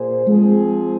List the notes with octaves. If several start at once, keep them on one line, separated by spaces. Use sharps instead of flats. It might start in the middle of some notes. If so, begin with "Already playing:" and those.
Already playing: A#2 A#3 G#4 C5
F3 G#3 C4 G#4